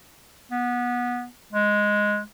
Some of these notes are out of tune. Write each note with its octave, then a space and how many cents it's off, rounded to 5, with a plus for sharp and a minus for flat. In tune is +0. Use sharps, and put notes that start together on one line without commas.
B3 -20
G#3 +0